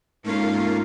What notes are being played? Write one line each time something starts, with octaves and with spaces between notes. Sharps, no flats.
G#2 A3 A#3 C#4 F4 A#4